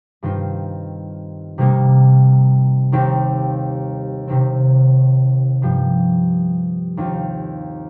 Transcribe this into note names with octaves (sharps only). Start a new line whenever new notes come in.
G2 D#3 C4 F4
C3 D#3 G3 A#3 D#4
D#2 D#3 C4 G4
C3 D#3 C4
G2 F3 A#3 G4
D#2 D#3 C4 F4